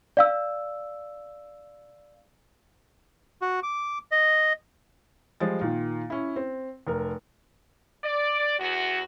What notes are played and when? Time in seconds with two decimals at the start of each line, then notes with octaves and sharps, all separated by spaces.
0.17 D5 F5 E6
3.42 F#4
3.63 D6
4.12 D#5
5.40 F3 G3 G#3 A6
5.61 A#2 D#3 F4
6.10 C#4 E4
6.36 C4
6.87 F1 A#4
8.05 D5
8.59 E2 F#4